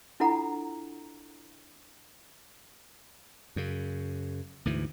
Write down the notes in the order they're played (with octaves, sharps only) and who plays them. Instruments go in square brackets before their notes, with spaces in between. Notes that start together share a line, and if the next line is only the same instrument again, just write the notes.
[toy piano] D4 E4 F4 A4 F#5 A#5
[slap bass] F#2 C#3
D2 G#2 E3